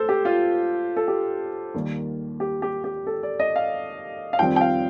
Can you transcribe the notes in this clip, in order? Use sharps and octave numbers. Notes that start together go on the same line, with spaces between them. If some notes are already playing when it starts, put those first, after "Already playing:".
Already playing: A3 A4 C5
G4
F4
A4
G4
D#2 D#3 G3 A#3
G4
G4
G4
A4
D5
D#5
F5
F5
F2 D#3 G3 C4 G5
G5
F5